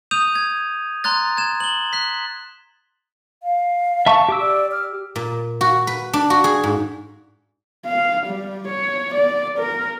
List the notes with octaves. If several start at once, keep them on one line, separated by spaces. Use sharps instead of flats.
D#6 G6 D#7 F7
G#6
A#5 C6 F#6 A6
G#6 E7
F#7 G7
F#6 B6
F5
E5 A5 C#6
G4 D6 E6
D5
F6
A#2
F#4
B4
D4
F#4
G#4
G#2
F5
G3
C#5
D5
A#4